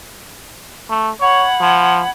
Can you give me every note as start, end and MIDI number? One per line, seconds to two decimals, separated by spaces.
0.90 1.10 57
1.21 1.45 73
1.21 2.10 78
1.21 2.10 83
1.21 2.10 92
1.61 2.02 53